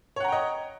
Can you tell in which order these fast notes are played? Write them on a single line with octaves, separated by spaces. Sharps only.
C#5 F#5 A#5 G5 D#5